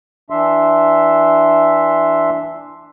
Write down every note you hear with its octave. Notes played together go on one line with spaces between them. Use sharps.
E3 D4 E5 C6